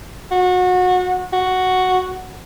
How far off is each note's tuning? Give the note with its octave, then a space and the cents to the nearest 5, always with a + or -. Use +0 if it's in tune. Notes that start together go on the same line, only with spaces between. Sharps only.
F#4 -25
F#4 +0